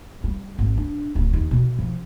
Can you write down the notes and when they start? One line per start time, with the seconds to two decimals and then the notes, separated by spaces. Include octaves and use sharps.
0.24 G3
0.59 G#1
0.77 D4
1.15 D1
1.33 D#2
1.51 B2
1.79 F3